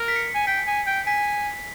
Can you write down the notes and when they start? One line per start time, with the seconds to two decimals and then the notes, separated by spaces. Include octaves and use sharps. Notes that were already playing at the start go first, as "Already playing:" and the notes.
Already playing: A#4
0.08 B6
0.16 C#7
0.35 G#5
0.47 G5 B6
0.67 G#5
0.87 G5
1.07 G#5 B6